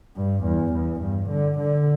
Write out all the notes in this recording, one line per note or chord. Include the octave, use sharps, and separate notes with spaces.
G2
E2
E2
G2
D3
D3